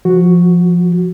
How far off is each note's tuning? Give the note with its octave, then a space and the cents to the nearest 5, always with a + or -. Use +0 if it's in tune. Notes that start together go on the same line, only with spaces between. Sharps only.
F3 +0 F#4 +0